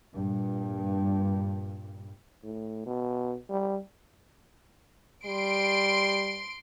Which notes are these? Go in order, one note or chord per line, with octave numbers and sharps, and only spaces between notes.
G2 A#2
A2
B2
G3
G3 C6 D7